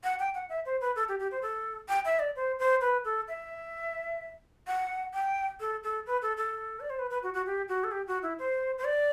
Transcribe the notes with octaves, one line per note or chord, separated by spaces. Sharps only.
F#5
G5
F#5
E5
C5
B4
A4
G4
G4
C5
A4
G5
E5
D5
C5
C5
B4
A4
E5
F#5
G5
A4
A4
B4
A4
A4
D5
C5
B4
B4
F#4
F#4
G4
F#4
A4
G4
F#4
E4
C5
C5
D5